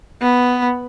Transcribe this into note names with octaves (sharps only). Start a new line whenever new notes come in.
B3